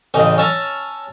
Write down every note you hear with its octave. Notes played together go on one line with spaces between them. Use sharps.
A1 C#3 D#4
C#4 E5 A5 A#5